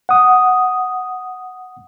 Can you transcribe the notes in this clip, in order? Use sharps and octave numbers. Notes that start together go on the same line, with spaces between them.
F#5 D#6